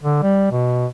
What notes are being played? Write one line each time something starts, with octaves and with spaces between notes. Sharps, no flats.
D3
G3
B2